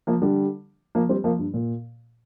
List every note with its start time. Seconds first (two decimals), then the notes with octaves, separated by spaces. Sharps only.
0.07 F3 A#3
0.22 D3 G3
0.95 F3 A#3
1.09 G3 C4
1.24 F3 A#3
1.39 G2
1.54 A#2